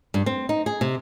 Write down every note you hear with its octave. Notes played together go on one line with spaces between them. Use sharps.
G2
C4
D#4
G#4
C3